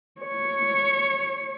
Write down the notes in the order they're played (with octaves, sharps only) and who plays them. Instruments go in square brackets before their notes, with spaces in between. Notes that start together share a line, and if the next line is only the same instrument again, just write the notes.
[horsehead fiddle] C#5